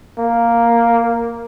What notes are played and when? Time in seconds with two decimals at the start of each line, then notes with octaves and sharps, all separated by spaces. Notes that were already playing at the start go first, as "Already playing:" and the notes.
0.19 A#3